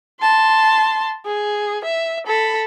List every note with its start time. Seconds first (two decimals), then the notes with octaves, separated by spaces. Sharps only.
0.20 A5 C6
1.26 G#4
1.84 E5
2.27 A4 B5